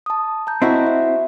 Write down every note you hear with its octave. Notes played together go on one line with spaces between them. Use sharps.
A5 D#6
A5 A#5 G6
C4 E4 F#4 D#5
E5